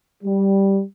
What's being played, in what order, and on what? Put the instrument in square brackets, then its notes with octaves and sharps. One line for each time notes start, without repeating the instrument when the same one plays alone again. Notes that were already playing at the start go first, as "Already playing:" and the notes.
[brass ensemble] G3